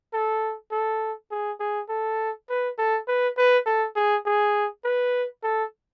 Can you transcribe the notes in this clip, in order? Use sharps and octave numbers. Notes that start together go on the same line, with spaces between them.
A4
A4
G#4
G#4
A4
B4
A4
B4
B4
A4
G#4
G#4
B4
A4